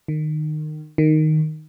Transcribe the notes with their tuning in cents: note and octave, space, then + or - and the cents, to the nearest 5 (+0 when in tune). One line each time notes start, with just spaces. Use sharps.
D#3 -25
D#3 -5